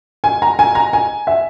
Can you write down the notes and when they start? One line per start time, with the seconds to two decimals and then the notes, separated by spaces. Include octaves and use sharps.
0.24 G#5
0.42 A#5
0.59 G#5
0.75 A#5
0.93 G#5
1.27 E5